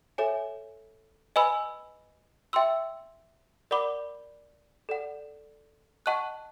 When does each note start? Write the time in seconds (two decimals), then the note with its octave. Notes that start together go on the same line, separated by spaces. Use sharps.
0.18 A4 C#5 E5 G#5
1.36 B4 D#5 G#5 B5 E6
2.53 E5 G5 C6 E6
3.71 A#4 D5 F#5 B5 D6
4.89 A4 D5 F#5
6.06 D#5 F#5 A5 C#6 F#6